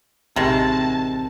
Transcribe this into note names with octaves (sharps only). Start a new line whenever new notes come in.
A1 C3 D#3 G#3 A5